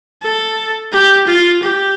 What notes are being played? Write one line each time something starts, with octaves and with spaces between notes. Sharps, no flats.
A4
G4
F4
G4